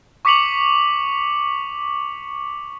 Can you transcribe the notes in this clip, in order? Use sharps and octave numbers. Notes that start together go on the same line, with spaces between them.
C#6 D6 B6 C#7 F7 F#7